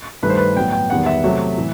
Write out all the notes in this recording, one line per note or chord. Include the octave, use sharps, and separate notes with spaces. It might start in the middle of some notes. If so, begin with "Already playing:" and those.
G2 D#3 A3 B4
C5
B4
A2 F#3 B3 G5
G5
E2 D#3 G3 B3 F#5
E5
C3 F#3 A3
A2 E3